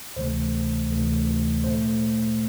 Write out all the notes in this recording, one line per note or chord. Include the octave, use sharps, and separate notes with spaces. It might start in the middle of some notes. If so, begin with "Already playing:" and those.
D2 C3 E3 A3 C5
D2 C3 E3 A3
A#2 A3 C5